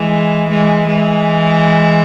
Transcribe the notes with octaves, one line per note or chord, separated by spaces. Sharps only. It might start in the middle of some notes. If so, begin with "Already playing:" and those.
Already playing: E3 G#3
E3 G#3
E3 G#3